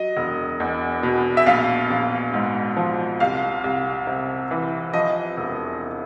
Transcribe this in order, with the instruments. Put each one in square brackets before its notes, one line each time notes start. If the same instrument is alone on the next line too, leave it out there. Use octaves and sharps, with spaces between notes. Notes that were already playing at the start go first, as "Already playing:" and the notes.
Already playing: [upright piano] F#3 D#5
E1
E2
B2
E5
A#1 F5
A#1
G#2
F3
C2 F5
C2
C3
E3
F3 D#5
E1